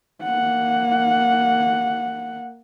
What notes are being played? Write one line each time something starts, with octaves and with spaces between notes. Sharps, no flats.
A#3 F#5